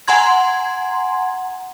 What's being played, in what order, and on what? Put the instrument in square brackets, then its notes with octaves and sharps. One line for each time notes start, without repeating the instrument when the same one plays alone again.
[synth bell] F#5 G#5 A#5 C6 G#6